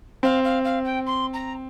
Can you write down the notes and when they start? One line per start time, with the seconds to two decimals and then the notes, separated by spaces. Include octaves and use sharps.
0.23 C4 F5
0.44 F5
0.64 F5
0.85 G5
1.06 C6
1.33 A#5